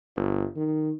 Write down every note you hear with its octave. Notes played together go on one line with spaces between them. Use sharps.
G1
D#3